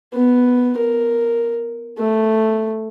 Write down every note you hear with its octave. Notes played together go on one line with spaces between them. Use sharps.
B3
A#4
A3